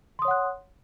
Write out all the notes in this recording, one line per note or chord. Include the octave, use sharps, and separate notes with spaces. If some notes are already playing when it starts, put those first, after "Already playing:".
C#5 F#5 C6 D#6 F#6